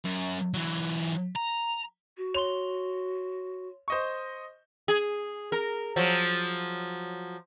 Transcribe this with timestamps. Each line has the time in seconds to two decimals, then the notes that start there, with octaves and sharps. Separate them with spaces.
0.05 F#2
0.54 E3 F#3
1.36 A#5
2.17 F#4
2.34 C#5 C6 F7 G7
3.88 C5 D#5 C#6
4.88 G#4
5.52 A#4
5.96 F3 F#3